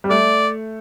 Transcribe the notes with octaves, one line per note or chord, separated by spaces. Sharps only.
G3
A3 D5